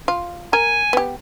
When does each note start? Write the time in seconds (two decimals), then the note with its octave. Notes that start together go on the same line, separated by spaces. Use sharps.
0.08 F4
0.53 A#4 G#5
0.93 B3 G4